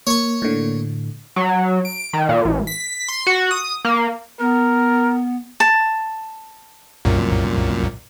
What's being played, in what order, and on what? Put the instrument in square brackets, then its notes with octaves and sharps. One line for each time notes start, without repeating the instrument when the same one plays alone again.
[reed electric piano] A#3 [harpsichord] C#5 C#6
[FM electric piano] A2 D3
[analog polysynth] F#3
D7
D#3
A#2
A1
B6
C6
F#4
D#6
A#3
[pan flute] B3 [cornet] A#4
[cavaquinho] A5
[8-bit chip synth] C2 F#2 A#2